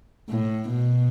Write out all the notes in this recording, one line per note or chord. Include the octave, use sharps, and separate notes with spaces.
A2
B2